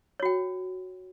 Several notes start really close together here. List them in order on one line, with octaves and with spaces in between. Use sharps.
C#5 F#4 G5